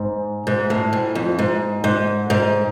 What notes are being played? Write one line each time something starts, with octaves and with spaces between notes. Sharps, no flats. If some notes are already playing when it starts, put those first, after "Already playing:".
Already playing: G#2
G#2
A2
G#2
F2
G#2
G#2
G#2